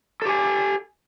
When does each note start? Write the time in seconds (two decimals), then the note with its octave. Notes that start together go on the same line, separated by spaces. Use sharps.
0.22 A4
0.25 G4
0.29 G#5